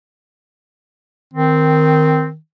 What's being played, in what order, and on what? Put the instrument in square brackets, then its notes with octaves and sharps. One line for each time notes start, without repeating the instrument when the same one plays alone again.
[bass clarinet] D#3 [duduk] C4